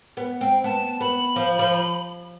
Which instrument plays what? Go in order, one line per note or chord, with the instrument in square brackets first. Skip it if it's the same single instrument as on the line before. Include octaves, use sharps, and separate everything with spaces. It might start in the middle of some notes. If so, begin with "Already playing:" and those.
[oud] B3
[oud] C4 [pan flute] G5
[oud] B3 [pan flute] A5
[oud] B3 [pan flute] B5
[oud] F3
F3